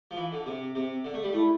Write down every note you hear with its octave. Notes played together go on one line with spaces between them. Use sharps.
F3
E3
D3
C3
C3 C4
D3
A3
G3
A3 E4